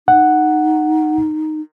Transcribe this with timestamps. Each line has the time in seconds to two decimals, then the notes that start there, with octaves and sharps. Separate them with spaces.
0.08 D#4 F#5